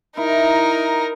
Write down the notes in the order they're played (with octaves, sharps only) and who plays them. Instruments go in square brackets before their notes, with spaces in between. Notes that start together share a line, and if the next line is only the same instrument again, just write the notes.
[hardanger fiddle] D#4 A#4 [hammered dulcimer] E4